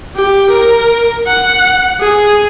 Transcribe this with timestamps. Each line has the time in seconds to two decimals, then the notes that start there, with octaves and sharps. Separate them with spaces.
0.16 G4
0.49 A#4
1.27 F#5
2.00 G#4